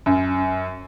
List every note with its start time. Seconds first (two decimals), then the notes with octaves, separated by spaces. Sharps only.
0.06 F#2